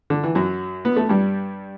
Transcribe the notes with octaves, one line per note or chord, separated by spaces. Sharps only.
D3
E3
F#2 F#3
B3
A3
G2 G3